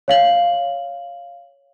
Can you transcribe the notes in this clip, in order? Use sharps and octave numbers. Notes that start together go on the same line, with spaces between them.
C#5 F5 F#7